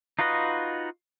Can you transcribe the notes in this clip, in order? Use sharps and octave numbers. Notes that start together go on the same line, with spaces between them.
D#4 F4 F#4 B4 D#5